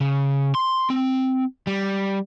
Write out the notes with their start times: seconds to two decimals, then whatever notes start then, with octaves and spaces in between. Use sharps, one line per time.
0.01 C#3
0.55 C6
0.90 C4
1.67 G3